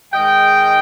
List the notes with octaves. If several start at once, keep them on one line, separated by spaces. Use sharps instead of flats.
G#2 D#3 G#3 D#5 G5